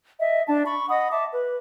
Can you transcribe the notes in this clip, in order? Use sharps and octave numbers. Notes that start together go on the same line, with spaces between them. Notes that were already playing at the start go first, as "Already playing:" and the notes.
D#5 E5
D4 A5
B5 C#6
D#5 F#5 B5 D#6
E5 A5 D6
B4